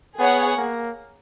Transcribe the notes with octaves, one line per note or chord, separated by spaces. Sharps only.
B3 G#4 C#5 F#5
A#3